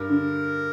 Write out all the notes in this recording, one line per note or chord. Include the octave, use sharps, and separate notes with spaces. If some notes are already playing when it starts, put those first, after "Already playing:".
Already playing: G2 A#4
D3